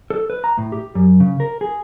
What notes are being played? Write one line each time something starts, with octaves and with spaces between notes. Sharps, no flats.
A4
B4
A#5
A2
G4
F#2
C#3
A#4
G#4